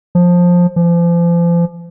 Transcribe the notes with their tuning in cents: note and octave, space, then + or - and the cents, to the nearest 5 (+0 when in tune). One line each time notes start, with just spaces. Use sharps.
F3 +15
F3 -35